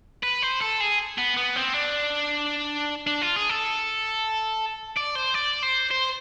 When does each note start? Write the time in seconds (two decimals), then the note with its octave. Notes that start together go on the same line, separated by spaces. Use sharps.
0.23 B4
0.42 C5
0.61 A4
0.80 G#4
1.18 B3
1.37 B3
1.56 C4
1.74 D4
3.07 D4
3.22 F4
3.36 G#4
3.49 A4
4.97 D5
5.15 C5
5.34 D5
5.63 C5
5.91 C5